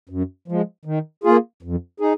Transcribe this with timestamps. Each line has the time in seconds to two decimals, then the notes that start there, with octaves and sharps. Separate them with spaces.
0.09 F#2
0.48 F3 G#3
0.85 D#3
1.24 A#3 F4 G#4
1.63 F2
2.00 D#4 G#4